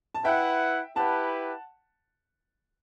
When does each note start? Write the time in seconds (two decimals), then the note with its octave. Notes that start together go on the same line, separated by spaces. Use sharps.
0.14 A5
0.24 E4 B4 E5 F#5 G5
0.96 E4 G4 B4 F#5 A5